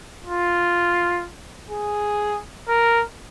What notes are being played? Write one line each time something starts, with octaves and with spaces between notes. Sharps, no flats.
F4
G#4
A#4